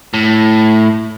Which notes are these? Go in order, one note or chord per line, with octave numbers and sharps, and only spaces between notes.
A2